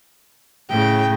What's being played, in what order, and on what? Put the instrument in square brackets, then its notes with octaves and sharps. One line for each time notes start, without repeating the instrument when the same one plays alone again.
[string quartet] A2 C#3 [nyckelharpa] G5